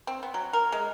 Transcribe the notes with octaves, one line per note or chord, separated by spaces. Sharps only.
C4
B3
F#3
A#4
G#3